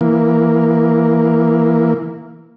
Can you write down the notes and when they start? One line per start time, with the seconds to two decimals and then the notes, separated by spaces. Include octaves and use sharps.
0.01 E3 A#3